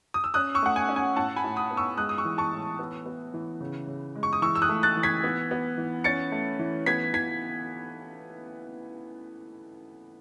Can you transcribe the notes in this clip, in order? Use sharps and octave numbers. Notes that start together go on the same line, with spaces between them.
D#6
E6
C#4 D#6 F#6
C#6 E6
A3 F#5
G#5
C#4
G#5
A2 F#5 A5
G#5 B5
A2
B5 D#6
B3
C#6 E6
G#3 D#6 F#6
D#6
C#6 E6
E3
A5 C#6
A2
B3
B3
E3
C#3
C#3
G#3
C#6
D#6
E3 C#6 E6
E6
D#6 F#6
A3
F#6 A6
E3
G#6 B6
B3
B3
E3
C#4 A6 C#7
A3
E3
B3 G#6 B6
E3 G#6 B6